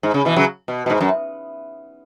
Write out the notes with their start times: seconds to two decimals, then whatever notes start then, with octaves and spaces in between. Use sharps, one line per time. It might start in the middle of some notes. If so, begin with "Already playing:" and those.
0.03 G#2
0.14 C#3
0.25 B2 E3
0.36 C#3 F#3
0.68 B2
0.86 B2
0.90 G#2
1.01 F#2